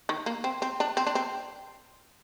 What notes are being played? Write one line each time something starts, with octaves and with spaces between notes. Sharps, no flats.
D#3
A#3
C4
C4
D4
C4
D4
C4